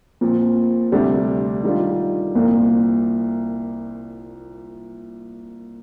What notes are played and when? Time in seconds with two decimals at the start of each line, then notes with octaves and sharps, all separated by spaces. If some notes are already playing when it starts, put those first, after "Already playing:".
0.21 A#2 F3 C4
0.92 D2 C3 G3 D4 G4
1.64 D#3 G3 D4 F4
2.35 C2 A#2 F3 A#3